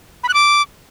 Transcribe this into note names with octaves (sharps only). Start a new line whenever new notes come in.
B5
F#6
D6